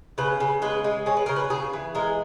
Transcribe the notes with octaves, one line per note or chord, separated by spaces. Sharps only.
C#3 B4
C#3
G#3 B4
G#3
G#3 C#5
B4
C#3 A#4
B4
C#3 G#4
E3
G#3 A#4